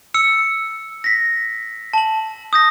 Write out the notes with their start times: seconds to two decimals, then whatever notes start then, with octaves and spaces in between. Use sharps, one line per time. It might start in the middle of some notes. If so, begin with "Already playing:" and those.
0.14 E6 C#7
1.04 A#6 B6
1.94 A5 F#7
2.53 D#6 G6 A#6